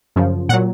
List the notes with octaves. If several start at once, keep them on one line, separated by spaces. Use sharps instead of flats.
F#2 C#3 F3
A#2 F#3 F#5